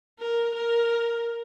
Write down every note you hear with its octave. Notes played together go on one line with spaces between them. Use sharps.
A#4
A#4